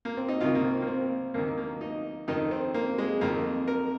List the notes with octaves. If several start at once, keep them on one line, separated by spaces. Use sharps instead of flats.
A#3
C4
D#4
C2 C3 D#3 F4
A#3
C4
A#3
C4
D#2 D#3 A#3
A#3
D#4
F2 D#3 D#4
C4
A#3
G#3
F2 D#3 A#3
A#4